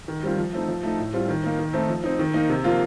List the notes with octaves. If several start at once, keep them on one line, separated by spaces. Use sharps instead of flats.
D#3
G3 C4 F4
F3
A3 C4 D#4
F3
A3 D#4
A2
G3 C4 F4
D#3
A#3 D#4
D#3
A3 C4 D#4
F3
C4 D#4
D#3
A#3 D#4
C3
F3 A#3 F4